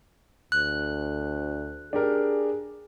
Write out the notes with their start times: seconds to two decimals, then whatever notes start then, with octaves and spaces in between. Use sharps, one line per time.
0.52 D2 F#6
1.93 D4 G4 G#4 A#4